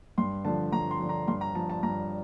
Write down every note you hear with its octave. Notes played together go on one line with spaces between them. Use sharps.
G2 C6
D3 F3 A5
G2 A#5
C6
D3 F3
A#5
G2 C6
A#5
F3 A5
A5
G2 A#5